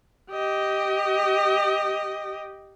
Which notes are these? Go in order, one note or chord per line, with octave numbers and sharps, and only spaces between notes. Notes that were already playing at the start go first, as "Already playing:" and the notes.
G4 D#5